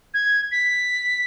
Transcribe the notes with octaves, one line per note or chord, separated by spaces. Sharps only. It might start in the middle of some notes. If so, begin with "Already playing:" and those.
G#6
B6